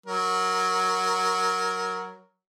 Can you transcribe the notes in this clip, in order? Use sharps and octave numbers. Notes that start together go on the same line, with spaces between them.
F#3 A#4